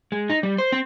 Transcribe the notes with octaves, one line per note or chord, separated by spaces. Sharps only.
G#3
D#4
G3
C5
C4